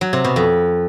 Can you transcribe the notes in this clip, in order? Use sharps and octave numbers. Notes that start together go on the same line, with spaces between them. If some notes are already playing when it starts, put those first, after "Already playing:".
F#3
C3
B2
F2